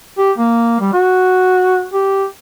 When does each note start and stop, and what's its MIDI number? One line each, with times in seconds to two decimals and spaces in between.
0.18 0.32 67
0.38 0.76 58
0.81 0.92 55
0.93 1.85 66
1.93 2.25 67